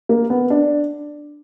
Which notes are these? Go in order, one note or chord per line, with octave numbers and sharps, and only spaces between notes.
A#3
B3
D4